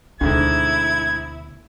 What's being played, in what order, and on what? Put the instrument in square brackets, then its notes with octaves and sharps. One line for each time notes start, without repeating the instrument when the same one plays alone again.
[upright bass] D2 B2 [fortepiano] G#2 D3 [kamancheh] E4 [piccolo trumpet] G#6